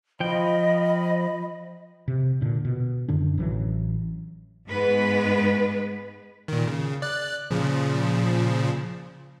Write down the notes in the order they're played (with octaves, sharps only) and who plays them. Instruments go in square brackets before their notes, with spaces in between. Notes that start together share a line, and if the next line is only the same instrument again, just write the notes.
[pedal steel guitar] F3 G5 [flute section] D#5 B5
[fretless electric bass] C3
A#2 D3
B2
F#2 D3 D#3 D4
A1 E3 F#3
[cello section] G#2 G#3 B3 B4
[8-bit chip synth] A#2 D#3
C#3
D5 F#6
A#2 C#3 F3